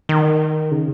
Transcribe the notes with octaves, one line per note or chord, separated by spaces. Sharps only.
D#3
C#3